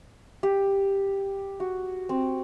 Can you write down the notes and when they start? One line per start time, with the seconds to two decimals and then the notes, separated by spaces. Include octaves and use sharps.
0.43 G4
1.60 F#4
2.09 C4